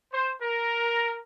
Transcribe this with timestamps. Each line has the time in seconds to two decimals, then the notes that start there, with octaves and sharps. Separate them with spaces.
0.12 C5
0.41 A#4